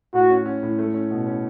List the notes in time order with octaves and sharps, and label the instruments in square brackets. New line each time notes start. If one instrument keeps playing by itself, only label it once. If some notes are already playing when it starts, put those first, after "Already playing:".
[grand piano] A2 [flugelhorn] F#4
[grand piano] C#4
C#4
A2
A3
C#4
B2
C#4